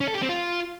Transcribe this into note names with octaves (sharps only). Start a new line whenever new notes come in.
C#4
A4
G4
C4
F4